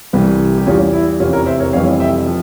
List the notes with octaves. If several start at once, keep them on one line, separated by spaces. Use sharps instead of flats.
C2 C3 E3 G3
G4
E2 E3 G3 C#4 F4
E4
F1 E2 C3 E3 C#4 F4
A#4 C#5
C5 E5
A#4 C#5
F1 F2 E3 G3 C#5 F5
E5 G5
F3